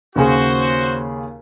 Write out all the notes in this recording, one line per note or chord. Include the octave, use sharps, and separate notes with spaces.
D#2 C#3 F#4 G#4 C5